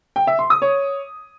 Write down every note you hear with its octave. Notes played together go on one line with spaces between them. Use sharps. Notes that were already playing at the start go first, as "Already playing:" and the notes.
G5
E5
C6
D#6
C#5